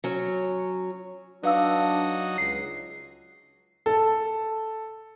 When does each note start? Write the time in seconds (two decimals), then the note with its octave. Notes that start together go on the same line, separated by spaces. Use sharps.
0.04 F#3 C#4
1.43 F#3 D4 D#4 B4 F5 E6
2.38 C#2 C7
3.86 A4